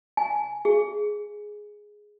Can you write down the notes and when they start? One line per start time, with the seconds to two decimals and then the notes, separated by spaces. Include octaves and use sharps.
0.17 G#5
0.65 G#4